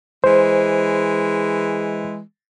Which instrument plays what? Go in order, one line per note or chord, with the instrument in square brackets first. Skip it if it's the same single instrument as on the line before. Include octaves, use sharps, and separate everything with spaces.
[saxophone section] E3 G#3 [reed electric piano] C5